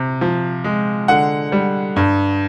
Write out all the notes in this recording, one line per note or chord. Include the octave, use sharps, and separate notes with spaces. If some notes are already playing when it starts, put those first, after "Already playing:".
Already playing: C3
F3
G#3
D3 F#5
G3
G2